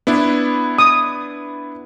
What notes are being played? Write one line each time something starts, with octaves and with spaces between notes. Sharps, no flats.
B3 D4 E4
D#6